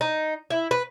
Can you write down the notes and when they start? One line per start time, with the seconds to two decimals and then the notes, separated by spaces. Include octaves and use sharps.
0.01 D#4
0.50 E4
0.71 B4